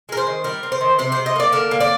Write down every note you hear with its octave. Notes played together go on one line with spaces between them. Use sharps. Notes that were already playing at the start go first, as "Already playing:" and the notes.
G#3 A#4
C5
D#3
G3 A#4
C4
C5
D#3
C3 C5
C3 C5
D#5
A#3 D5
D3 A#4
A#3
D5